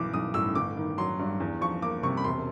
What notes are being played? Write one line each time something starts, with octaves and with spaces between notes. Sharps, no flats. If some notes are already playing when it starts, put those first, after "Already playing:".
Already playing: B1 E3 D6
B1 D#6
A2 E6
G1 D6
D#3
F#3 C6
G2
E2
F3 C#6
A#3 D6
C3 C#6
B5
E1 C6